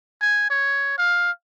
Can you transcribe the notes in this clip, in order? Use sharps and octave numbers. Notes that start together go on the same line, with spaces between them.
G#5
C#5
F5